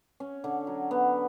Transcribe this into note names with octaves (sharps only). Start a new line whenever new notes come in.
C#4
D3
F#3
B3